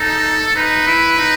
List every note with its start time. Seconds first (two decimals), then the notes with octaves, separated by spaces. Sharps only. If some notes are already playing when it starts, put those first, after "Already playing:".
Already playing: D#4 A4
0.56 D#4 B4
0.87 E4
1.18 D#4